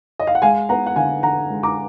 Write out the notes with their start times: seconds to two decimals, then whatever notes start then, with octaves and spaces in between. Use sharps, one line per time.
0.19 D#5
0.27 F5
0.35 F#5
0.42 G#3 F5 G#5
0.69 B3 F#5 A#5
0.87 F#5
0.96 D3 F5 G#5
1.23 D3 F#5 A#5
1.50 G#3
1.63 A#5 D6